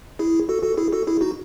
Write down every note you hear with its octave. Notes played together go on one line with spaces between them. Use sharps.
E4 G#4
F#4 A4
F#4 A4
E4 G#4
F#4 A4
E4 G#4
D#4 F#4